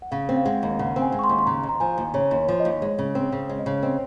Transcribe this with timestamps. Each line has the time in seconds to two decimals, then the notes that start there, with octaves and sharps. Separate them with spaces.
0.02 F#5
0.11 C#3 F5
0.29 C4
0.36 F5
0.45 G#3 F#5
0.63 D#2
0.79 C#3 F#5
0.96 C4
1.02 G#5
1.12 G#3
1.19 C#6
1.24 C6
1.29 D#2
1.39 C6
1.46 C#3 A#5
1.63 D#2
1.69 A#5
1.80 F3 G#5
1.98 D#2
2.14 C#3 C#5
2.31 D#2
2.36 C#5
2.48 F3
2.60 D#5
2.65 D#2
2.82 G#3 C#5
2.99 C#3
3.15 C4 C5
3.32 C#3
3.49 G#3 C#5
3.59 D#5
3.66 C#3 C#5
3.83 C4 D#5